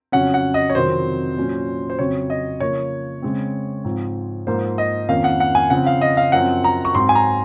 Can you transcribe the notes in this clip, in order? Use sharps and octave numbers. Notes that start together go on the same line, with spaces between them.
F2 C#3 F#3 C#4 F#5
F#5
D#5
C#5
F2 C3 D#3 F#3 C5
A#2 F#3 C#4
C5
F2 C#3 F#3 C4 C#5
D#5
C#3 F3 A#3 C#5
C#3 G#3 C4
G#2 F3 C4
G#2 F3 A#3 C5
D#5
F2 D#3 A#3 C#4 F5
F#5
F#5
G#5
C#3 F3 C4 F#5
F5
D#5
F5
F#2 F3 C4 F#5
A#5
C#6
G#2 F#3 C4 C6
G#5
A#5